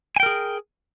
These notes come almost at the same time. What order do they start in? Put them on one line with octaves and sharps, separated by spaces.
G#5 G5 A#4 G#4